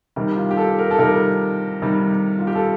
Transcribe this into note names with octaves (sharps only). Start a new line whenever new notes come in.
C3 D#3 G3 G4
F4
G4
A4
A#4
A4
C3 D#3 G3 A#4
C3 D#3 G3
F4
G4
A4